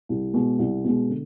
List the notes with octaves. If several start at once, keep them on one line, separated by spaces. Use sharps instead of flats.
C2
B2 G#3
C2
B2 G#3
D3